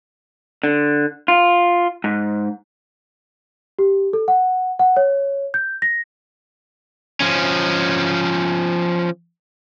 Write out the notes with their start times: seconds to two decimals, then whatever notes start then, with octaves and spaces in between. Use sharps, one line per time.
0.64 D3
1.28 F4
2.04 G#2
3.79 G4
4.13 A4
4.28 F#5
4.79 F#5
4.97 C#5
5.54 G6
5.82 A#6
7.20 F3 C#4